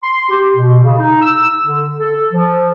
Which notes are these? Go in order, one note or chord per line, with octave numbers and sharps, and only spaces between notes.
C6
G4
B2
C#3
D#4
E6
D3
A4
F3